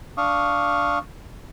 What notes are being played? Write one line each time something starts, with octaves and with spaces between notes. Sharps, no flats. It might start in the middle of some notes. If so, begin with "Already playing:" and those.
D4 F5 C#6 D#6